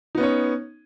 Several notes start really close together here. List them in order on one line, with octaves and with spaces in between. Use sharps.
D#4 B3 C#4 C#5